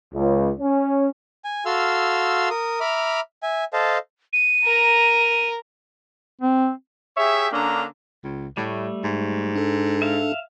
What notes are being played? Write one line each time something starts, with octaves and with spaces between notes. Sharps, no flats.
C#2
C#4
G#5
F#4 A4 F5 C6 E6 F6
A#4 D#6
E5 A#5 B5 D6 F6
E5 G#5
A4 C5 D#5 F5 A5
D#7
A#4 A#5
C4
G4 G#4 C#5 E5
D3 A#3 C#4 D4 A#5
C#2
A2 G3 A3
G#2
D4 A4
E5 F5